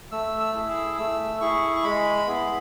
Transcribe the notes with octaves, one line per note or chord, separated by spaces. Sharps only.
A3 E6
E6
E4 G#4
E6
A3 E6
E4 G#4 C#6
C#6
G#3 B5
B3 E4 G#4